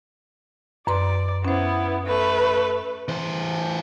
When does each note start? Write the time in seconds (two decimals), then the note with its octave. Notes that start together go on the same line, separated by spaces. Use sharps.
0.87 F#2 B4 D5 C6
1.45 B3 C#4 E4 C5
2.06 A3 B4
3.08 E3 C5